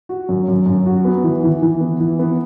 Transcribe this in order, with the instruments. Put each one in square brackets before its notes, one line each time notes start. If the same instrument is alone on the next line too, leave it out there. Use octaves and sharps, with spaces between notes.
[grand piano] F#4
F#2
F#2
F#2
F#4
B3
E3
E3
E3
B3
E3
B3